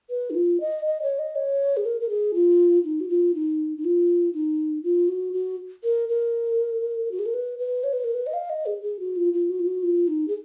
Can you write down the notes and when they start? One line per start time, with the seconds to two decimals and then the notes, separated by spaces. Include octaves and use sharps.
0.10 B4
0.30 D#4
0.35 F4
0.61 D#5
0.85 D#5
1.02 C#5
1.19 D#5
1.36 C#5
1.77 G#4
1.85 A#4
2.01 A#4
2.09 G#4
2.34 F4
2.84 D#4
3.00 F#4
3.09 F4
3.35 D#4
3.77 D#4
3.85 F4
4.34 D#4
4.84 F4
5.09 F#4
5.33 F#4
5.84 A#4
6.09 A#4
7.11 F#4
7.19 G#4
7.26 A#4
7.34 B4
7.59 B4
7.84 C#5
7.93 B4
8.04 A#4
8.14 B4
8.27 D#5
8.34 F5
8.50 D#5
8.66 G#4
8.82 G#4
9.00 F#4
9.16 F4
9.33 F4
9.50 F#4
9.59 F4
9.67 F#4
9.83 F4
10.08 D#4
10.28 G#4